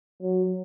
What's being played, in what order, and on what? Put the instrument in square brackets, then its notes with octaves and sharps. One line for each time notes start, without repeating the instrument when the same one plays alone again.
[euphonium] F#3